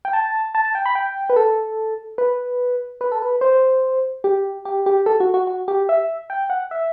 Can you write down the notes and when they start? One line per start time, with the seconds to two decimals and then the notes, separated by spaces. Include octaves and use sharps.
0.05 G5
0.13 A5
0.55 A5
0.65 A5
0.75 G5
0.86 B5
0.95 G5
1.30 B4
1.36 A4
2.18 B4
3.01 B4
3.12 A4
3.22 B4
3.41 C5
4.24 G4
4.65 G4
4.86 G4
5.06 A4
5.20 F#4
5.34 F#4
5.47 F#4
5.68 G4
5.89 E5
6.30 G5
6.50 F#5
6.71 E5